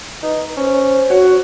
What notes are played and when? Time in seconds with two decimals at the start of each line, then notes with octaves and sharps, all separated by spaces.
0.23 D#4 B4
0.57 C#4 C5
1.10 F#4 C#5